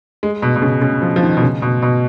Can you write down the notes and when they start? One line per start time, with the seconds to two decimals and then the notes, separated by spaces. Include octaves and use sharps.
0.23 G#3
0.42 B2
0.56 B2
0.62 C#3
0.82 C#3
1.02 F3
1.16 F3
1.23 D#3
1.37 B2
1.42 C#3
1.62 B2
1.82 B2